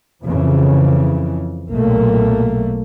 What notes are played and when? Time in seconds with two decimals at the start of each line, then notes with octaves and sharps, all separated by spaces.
0.23 F2 C#3 E3 F3
1.72 B1 A#2 A3 A#3